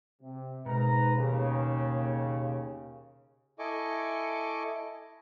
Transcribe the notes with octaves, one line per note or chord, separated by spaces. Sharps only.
C3
G#2 B2 A#4 B4 A#5
D#2 C#3
E4 A4 D#5 G#5 C#6 D6